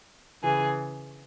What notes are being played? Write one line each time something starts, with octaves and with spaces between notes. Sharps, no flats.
C#3 E3 G#4